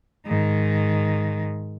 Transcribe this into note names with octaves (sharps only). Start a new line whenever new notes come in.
G#2 D#3